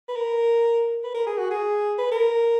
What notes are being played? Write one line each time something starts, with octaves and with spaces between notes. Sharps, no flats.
B4
A#4
B4
A#4
G#4
F#4
G#4
B4
A#4